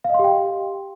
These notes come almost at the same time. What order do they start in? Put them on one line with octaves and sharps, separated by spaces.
F5 D#5 C6 G4 G5